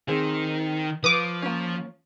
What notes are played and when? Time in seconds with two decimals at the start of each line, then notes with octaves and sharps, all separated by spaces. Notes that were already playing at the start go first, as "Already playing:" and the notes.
0.08 D#3 C4 G#4
1.04 F3 B4 D6 D#6
1.42 A#3 C#4